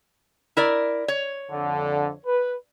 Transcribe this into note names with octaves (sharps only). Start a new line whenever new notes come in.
E4 A#4 D5
C#5
F2 D3
B4